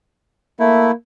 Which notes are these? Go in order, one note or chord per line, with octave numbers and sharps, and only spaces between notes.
A3 A#3 E4